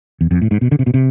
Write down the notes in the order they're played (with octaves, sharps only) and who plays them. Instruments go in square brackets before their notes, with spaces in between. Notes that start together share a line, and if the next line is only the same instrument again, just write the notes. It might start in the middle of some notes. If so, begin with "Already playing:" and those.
[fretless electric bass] E2
F2
A2
G#2
B2
D3
C3
B2
C3